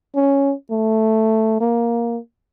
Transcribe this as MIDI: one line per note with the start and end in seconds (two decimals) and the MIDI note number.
0.15 0.54 61
0.71 1.57 57
1.60 2.18 58